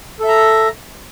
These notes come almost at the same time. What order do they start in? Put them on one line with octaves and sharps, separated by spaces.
A4 E5 A#5